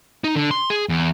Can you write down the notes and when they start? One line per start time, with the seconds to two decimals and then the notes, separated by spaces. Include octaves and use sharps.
0.24 D#4
0.36 D3
0.51 C6
0.70 G#4
0.89 E2